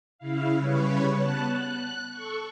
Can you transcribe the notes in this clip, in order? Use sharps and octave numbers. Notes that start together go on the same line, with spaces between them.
C#3 E4 F5
C#3 G3 B4 C#5
B3 A5 F#6
F#6
A4 C#6